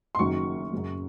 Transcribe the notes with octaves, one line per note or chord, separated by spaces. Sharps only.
C6
F#1 F#2 D#3 F#3 C#6
F#2 C#3 F#3